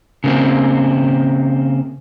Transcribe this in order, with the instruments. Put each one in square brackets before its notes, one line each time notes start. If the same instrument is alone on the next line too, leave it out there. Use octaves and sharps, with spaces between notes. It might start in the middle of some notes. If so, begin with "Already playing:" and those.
[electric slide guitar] C#3 A#3 C4